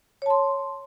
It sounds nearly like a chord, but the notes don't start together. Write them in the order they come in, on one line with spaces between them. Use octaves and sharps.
C#5 A5 C6